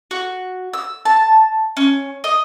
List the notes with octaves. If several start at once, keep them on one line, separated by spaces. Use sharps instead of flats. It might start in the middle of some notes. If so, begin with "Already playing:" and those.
F#4
E6
A5
C#4
D#5